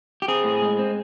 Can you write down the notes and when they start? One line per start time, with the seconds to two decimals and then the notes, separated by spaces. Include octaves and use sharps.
0.22 G4
0.28 C4 G#4
0.44 A2
0.62 G#3
0.79 C4